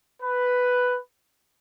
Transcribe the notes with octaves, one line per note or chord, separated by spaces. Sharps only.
B4